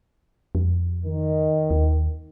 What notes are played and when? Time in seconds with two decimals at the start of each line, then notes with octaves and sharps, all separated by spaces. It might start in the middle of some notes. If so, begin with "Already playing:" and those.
0.55 F2
1.05 D#3
1.70 D#2